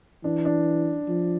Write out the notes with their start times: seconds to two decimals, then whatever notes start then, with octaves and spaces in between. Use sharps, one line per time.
0.24 E3 D4
0.45 D4
1.08 F3